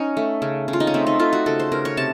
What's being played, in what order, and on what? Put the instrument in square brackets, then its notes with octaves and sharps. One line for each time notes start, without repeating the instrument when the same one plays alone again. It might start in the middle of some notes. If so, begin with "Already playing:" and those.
Already playing: [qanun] C#4 D#4
A3
C#3
C#3
F4
D#4
C#4
A3 C4
D#4
A3 F4
F#4
C#3 A4
C5
C#3 A#4
C#5
C3 A5